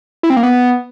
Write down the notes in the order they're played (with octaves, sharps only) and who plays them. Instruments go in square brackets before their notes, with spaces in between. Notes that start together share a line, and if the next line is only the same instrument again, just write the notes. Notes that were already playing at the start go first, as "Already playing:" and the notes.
[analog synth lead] E4
C4
A#3
B3